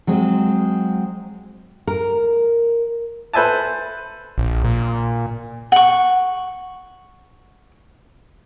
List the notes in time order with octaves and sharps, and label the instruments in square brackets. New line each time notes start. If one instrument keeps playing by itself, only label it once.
[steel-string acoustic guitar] F#3 G#3 C4
[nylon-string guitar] A#4
[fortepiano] A4 B4 C5 E5 G#5 A5
[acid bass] A#1
A#2
[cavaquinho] F#5 C#6